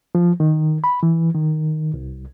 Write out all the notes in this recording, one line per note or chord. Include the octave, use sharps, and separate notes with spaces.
F3
D#3
B5
E3
D#3
C2